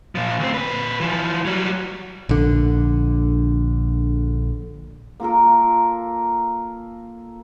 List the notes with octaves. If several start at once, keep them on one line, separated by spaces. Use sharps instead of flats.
A#2 F3
D2 C4
A#2 B4
E3 F3
F#3 G3
A#1 D3
A#3 F4 A4 A#4